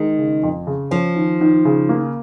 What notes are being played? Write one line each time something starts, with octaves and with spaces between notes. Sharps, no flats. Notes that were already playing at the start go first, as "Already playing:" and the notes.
Already playing: D#3 G#3
C#3
F2
C#3
F3 C#4
D#3
D#3
C#3
A#3